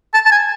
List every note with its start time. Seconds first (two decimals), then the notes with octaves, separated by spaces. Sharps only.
0.14 A5
0.26 A5
0.32 G#5